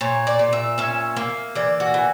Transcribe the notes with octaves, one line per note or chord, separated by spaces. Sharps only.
A#2 C#5
D5
A#2
E5
C#4 E5
A#3
E3 D5
F#4
E3